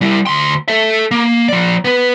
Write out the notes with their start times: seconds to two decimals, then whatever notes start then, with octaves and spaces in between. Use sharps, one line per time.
0.01 G3 E4
0.27 D2 C6
0.68 A4 E5
1.11 A#3
1.49 F3 D5
1.85 B3 B4